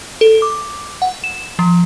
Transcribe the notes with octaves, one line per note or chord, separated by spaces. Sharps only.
A4
D6
F#5
E7
F3